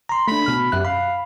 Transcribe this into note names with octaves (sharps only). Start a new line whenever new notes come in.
A#5 C6
A3 D4 B5
B2 F6
F#2 G4 E5 F#6
F5 B5